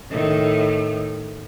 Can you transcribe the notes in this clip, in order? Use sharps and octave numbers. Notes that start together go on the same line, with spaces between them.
A2 D#3